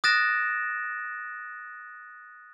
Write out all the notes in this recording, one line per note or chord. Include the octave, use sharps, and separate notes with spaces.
D#6 F#6 A6 A#6 D7 E7